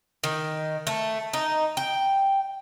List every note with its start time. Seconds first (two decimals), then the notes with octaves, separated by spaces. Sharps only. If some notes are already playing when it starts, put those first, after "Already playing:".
0.24 D#3
0.87 A3
1.33 D#4
1.77 G5